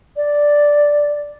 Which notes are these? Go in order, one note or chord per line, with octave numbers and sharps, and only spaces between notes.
D5